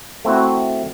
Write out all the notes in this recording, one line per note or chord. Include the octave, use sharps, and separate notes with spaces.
A3 C4 E4 F#4